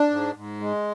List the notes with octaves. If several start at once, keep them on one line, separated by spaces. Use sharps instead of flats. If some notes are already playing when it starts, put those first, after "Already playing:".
Already playing: D4
G#2
G#2
G#3